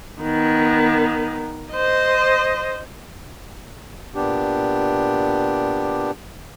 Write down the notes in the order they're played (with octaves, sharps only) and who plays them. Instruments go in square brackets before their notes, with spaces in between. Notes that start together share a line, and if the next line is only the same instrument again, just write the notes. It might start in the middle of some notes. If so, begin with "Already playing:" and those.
[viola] D#3 B3
C5 D#5
[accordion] A#2 B3 D4 G4